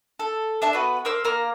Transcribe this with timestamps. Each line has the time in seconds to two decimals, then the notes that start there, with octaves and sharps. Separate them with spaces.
0.19 A4
0.62 D4 E5 A5
0.73 B3 F#4 B4
1.05 A#4 C5 D6 E6
1.25 A#3 A#5 F6